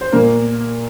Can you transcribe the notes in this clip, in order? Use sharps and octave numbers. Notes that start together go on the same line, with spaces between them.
C5
A#2 A#3 A#4